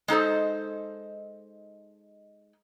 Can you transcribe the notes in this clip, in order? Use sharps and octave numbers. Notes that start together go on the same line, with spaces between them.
G#3 D#4 A4 C5